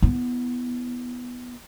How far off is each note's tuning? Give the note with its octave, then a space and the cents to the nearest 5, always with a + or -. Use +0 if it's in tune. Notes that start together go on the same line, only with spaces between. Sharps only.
B3 +0 E4 +0